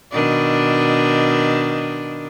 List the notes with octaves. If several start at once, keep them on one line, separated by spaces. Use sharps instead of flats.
B2 D#3 D4